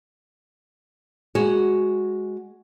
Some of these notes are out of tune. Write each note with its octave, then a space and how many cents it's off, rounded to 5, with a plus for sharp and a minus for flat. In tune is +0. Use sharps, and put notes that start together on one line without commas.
G#3 +0 F#4 +0